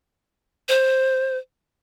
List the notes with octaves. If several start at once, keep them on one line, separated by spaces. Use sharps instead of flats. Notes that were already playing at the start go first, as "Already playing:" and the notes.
C5